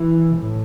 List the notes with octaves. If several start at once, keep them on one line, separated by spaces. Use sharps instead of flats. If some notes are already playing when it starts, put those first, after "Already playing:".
Already playing: E3
A2